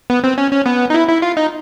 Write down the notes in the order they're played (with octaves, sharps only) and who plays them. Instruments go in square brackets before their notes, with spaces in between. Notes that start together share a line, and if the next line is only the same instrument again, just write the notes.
[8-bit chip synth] B3
C4
C#4
C#4
B3
D#4
E4
E4
F4
D#4